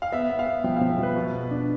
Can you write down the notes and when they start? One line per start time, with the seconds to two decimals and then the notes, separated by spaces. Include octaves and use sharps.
0.02 F5
0.12 B3 E5
0.30 B3
0.39 F5
0.46 B3
0.64 F3 G5
0.76 F3 F5
0.89 E5
0.98 F3 B4
1.16 B2
1.33 B3
1.51 D4